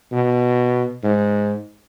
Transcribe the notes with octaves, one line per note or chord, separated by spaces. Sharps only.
B2
G#2